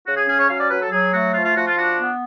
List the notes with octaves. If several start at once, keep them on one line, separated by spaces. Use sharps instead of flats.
C#3 F#4
G#4
C#4 G#4
C#5
F#3 F5
D5
F#3 B4
A4
F#3 G#4
A3 F#4
F3 F4
F4
F3 F#4
F4
D4 F#4
B3